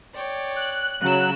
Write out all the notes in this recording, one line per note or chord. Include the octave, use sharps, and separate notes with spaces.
C#5 D5 G5
F#6
C#3 F#3 E6